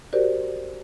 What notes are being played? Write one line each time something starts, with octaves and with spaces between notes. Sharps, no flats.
F#4 G4 A#4 C5 D5